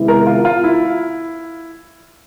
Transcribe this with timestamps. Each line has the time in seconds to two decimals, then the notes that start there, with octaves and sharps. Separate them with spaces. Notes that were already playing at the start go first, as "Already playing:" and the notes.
Already playing: C3 D#3 G#3 B3 E4
0.08 A#4
0.27 F4
0.45 F4
0.64 E4